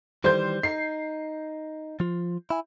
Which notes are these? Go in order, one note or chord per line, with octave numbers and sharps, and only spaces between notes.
D#3 E3 G3 C5 G6
D#4 C7
F3 F4
E4 G#5